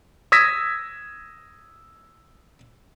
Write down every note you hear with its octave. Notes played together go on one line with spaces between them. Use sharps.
D#6 E6 G#6 A#6 B6